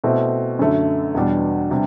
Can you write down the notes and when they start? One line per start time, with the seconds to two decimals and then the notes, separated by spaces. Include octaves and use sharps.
0.04 B2 A3 C4 E4
0.59 F#2 D3 A3
1.15 E2 B2 G3 D4
1.71 C3 G3 D4